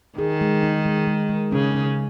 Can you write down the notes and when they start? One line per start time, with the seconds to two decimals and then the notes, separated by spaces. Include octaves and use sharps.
0.18 D#3 G#4
0.41 G#3
0.63 D#4
0.86 G#3
1.07 G#3
1.29 G#3
1.52 C#3 C#4
1.75 C#4